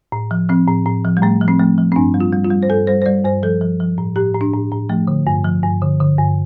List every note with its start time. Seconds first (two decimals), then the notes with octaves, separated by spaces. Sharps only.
0.12 A2
0.31 F3
0.49 F3 C4
0.68 A2
0.86 A2
1.05 F3
1.17 G3
1.22 A2 A3
1.41 F3
1.48 C4
1.59 F3 A3
1.78 F3
1.92 C4
1.96 G2 D4
2.14 G3
2.20 F4
2.32 G3
2.45 F4
2.51 G3
2.63 C5
2.70 G2 A4
2.87 G3 C5
3.02 C5
3.06 G3 D5
3.24 G2 C5
3.43 F3 A4
3.61 F3
3.80 F3
3.98 A2
4.16 A2 G4
4.34 A2
4.41 D4
4.53 A2
4.71 A2
4.89 F3 A3
5.07 D3
5.27 G2
5.44 F3
5.63 G2
5.81 D3
6.00 D3
6.18 G2